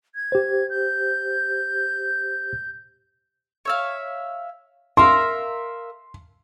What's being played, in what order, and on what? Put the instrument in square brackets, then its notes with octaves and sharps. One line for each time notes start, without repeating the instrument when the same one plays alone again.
[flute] G#6
[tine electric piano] G4 C5
[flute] G6
[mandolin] C#5 E5 F5
[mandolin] A#4 E5 F5 [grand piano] C6